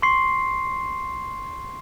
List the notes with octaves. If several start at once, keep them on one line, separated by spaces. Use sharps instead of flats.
C6 C#6 C7